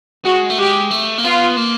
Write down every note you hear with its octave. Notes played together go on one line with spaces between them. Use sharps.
G#3 F#4
A3
G#3 G4
A3
A#3
B3 F4
A#3